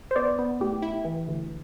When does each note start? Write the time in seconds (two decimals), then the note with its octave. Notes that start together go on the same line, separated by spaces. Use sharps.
0.11 C5
0.16 B3 D5
0.39 B3
0.60 A2 G4
0.82 E4
1.05 E3
1.28 D2